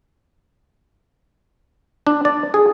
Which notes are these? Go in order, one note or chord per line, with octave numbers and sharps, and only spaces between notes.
D4
D5
G#4